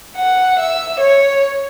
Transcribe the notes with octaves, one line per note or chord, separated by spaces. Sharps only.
F#5
E5
C#5